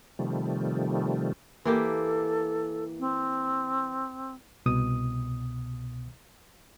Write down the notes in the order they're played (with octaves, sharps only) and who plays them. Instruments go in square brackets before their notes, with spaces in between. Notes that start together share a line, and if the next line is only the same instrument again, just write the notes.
[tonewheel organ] C3 D#3 F3 G3 A3
[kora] E3 A#3 G4 [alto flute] A4
[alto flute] C4
[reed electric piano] C2 B2 D#6